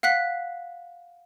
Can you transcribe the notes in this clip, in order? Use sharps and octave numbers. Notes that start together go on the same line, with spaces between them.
F5 F#5 F#6 B6 C7